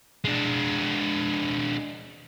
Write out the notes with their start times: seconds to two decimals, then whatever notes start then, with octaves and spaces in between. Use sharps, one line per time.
0.25 G#3 D4